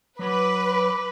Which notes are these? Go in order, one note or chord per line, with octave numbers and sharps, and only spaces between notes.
F#3 B4 D6